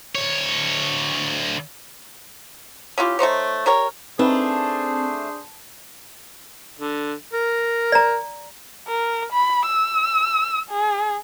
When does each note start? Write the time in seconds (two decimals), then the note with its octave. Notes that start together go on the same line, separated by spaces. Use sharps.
0.15 D2 C#5
2.98 C#4 E4 F4 G4
3.19 A3 D#4 C5 C#5
3.66 G3 A#4 C#5
4.19 A3 C4 D4 D#4 G#4 B4 C5
6.79 D3
7.34 A#4
7.92 D5 A#5
8.88 A#4
9.32 B5
9.67 E6
10.70 G#4